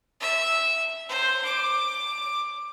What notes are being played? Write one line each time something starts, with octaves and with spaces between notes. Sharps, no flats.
E5
C5
D6